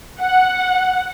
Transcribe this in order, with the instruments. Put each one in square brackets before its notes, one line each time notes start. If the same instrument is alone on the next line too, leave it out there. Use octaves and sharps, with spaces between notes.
[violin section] F#5